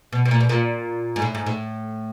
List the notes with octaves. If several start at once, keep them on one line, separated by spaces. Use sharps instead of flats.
B2
B2
A#2
B2
A#2
G#2
A2
G#2
A2